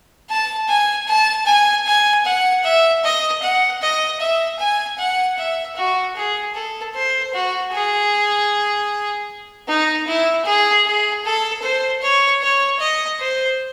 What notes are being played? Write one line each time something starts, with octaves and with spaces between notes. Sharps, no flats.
A5
G#5
A5
G#5
G#5
F#5
E5
D#5
F#5
D#5
E5
G#5
F#5
E5
F#4
G#4
A4
C5
F#4
G#4
D#4
E4
G#4
G#4
A4
C5
C#5
C#5
D#5
C5